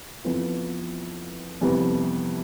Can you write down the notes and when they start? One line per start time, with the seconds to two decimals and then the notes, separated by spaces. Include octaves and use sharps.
0.24 F2 E3 B3 F4 B4
1.61 F2 C3 E3 G3 B3